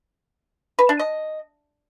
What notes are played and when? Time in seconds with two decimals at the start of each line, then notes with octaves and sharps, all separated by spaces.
0.79 B4
0.89 D4
0.99 D#5